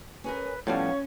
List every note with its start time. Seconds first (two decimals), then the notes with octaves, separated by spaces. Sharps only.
0.24 C#4 G#4 A#4 B4
0.67 A2 F3 G3 B3 C#4 C#5 F5